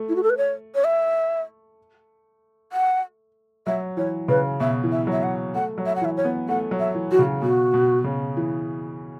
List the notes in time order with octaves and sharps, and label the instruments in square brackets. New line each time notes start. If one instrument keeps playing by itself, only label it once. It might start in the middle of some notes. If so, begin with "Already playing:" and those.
Already playing: [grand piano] A3
[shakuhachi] E4
F#4
A4
B4
C#5
C#5
E5
F#5
[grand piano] F#3 [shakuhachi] E5
[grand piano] E3 [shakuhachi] C#5
[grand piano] C#3 [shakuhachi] B4
[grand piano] B2 [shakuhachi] E5
[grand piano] E3
[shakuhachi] E5
[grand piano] F#3 [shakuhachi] E5
[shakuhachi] F#5
[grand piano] A3 [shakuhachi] F#5
[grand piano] F#3
[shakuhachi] E5
F#5
[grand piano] E3 [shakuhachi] E5
[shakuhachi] C#5
[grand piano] B3
[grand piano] A3 [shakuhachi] F#5
[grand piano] F#3
[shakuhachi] E5
[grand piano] E3
[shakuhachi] F#4
[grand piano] C#3
[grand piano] B2 [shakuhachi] F#4
[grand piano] B2
C#3
E3